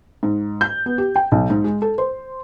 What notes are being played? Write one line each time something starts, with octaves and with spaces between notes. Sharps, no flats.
G#2
G6
B3
G4
G5
B1
G#2
G#3
A4
C5